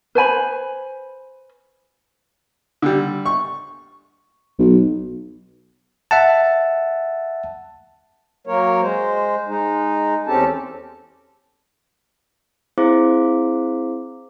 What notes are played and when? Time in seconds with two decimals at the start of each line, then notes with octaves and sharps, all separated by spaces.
0.15 B4 C5 G#5 B5
2.82 D3 G3
3.26 C#6
4.59 B1
6.11 E5 F#5 A5
8.47 F#3 A#3 A#4 C#5
8.81 G#3 C5
9.48 G#3 D#4
10.27 E2 C4 C#4 G4 A4 A5
12.78 C4 E4 G#4 C5 F5 D6